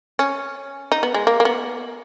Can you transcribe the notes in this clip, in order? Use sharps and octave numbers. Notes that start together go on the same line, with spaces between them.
C#4
D#4
B3
G#3
A#3
A#3
B3